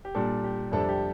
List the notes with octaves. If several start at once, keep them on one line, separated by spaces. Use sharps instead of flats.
G4
A#2 G3 D4 A4
G4
F2 C3 G3 D4 A4
G4